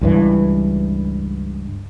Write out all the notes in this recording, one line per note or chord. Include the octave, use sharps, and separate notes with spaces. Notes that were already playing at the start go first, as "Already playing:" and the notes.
C#2 G2 E3